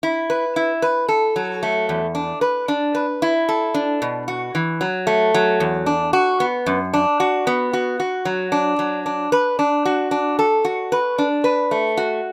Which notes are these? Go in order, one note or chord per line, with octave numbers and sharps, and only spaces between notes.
E4
B4
E4
B4
A4
F#3
A3
E2
D4
B4
D4
B4
E4
A4
D4
B2
F#4
E3
F#3
A3
F#3
E2
D4
F#4
B3
F#2
D4
F#4
B3
F#4
F#4
F#3
D4
F#3
D4
B4
D4
F#4
D4
A4
F#4
B4
D4
B4
A3
F#4